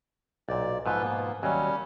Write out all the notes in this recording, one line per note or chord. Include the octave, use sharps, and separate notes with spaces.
B1 A#2 D5
G#2 B2 F3 F4 A4 B4
A#3 B3
D#2 F#3 G3 C#4